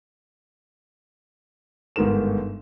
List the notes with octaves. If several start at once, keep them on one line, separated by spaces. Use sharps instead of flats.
G1 G#2 D#3 A#4 E7